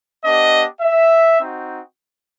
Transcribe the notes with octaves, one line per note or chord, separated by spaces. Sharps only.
B3 D4 G4 D#5
E5
C4 D#4 F#4